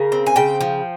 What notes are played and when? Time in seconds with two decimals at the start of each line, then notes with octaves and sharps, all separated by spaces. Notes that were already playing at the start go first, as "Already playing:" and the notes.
Already playing: C#3 A#4
0.12 C4
0.27 G#5
0.36 C#3 G5
0.61 F3